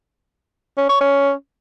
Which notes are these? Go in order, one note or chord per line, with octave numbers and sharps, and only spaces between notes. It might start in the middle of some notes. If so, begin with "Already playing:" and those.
C#4
C#5
C#4